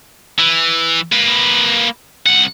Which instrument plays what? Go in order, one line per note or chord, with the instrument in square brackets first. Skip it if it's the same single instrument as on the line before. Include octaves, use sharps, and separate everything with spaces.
[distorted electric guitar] E3
A#3 B4
C2 F#5